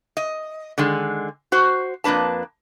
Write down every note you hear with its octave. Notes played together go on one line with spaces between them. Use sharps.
D#5
D3 D#3 G#3
F#4 C5
F2 A#3 D4 B4 A5